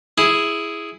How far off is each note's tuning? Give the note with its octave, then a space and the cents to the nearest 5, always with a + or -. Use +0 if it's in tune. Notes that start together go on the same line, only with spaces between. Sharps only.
E4 +0 G#4 +0